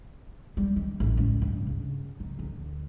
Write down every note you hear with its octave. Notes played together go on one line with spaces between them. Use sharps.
G3
D#3
A1
C#2
G2
C#3
D#4
D2